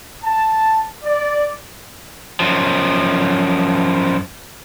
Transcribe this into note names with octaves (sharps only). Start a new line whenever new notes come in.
A5
D5
F#2 F3